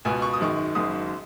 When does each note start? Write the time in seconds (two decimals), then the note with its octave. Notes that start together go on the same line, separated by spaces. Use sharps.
0.05 C#2 B2 B3 G#5
0.22 C#6
0.33 D#6
0.39 G#1 F#2 D#3 G#3 C#6
0.75 F#1 F#2 D#3 G#3 D#6